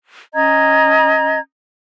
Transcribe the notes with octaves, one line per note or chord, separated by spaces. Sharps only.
C#4 D#5 A#5 G#6